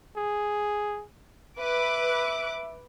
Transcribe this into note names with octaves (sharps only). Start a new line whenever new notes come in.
G#4
B4 E5 D6 F#6